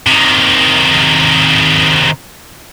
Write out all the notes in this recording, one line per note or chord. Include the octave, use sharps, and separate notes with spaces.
C3 D#3